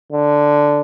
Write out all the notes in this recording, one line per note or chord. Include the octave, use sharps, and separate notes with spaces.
D3